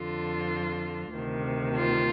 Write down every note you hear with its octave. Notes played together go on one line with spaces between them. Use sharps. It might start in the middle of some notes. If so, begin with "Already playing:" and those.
Already playing: F2 D3 F4
D2 C3 D#3
F4